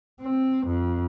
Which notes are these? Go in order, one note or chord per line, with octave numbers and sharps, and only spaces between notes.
C4
F2